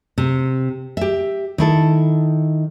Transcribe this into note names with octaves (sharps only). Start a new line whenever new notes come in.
C3
G4 E5
D#3 E4 A4